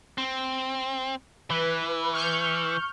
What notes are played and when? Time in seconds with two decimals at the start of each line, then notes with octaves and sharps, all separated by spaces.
0.18 C4
1.50 E3 B4
2.13 C#6 F6 G6